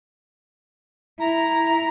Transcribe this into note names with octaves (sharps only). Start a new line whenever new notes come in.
E4 A#5